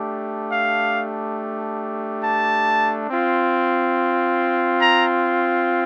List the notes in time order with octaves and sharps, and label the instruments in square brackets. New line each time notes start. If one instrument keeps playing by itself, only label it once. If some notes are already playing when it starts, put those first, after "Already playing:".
Already playing: [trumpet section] A3 D4 G4
F5
A5
C4 F4
A#5